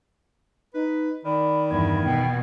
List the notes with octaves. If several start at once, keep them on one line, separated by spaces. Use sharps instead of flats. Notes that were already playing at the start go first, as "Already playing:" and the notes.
D#4 B4
D#3 D5 B5
E2 G2 G#6
B2 G5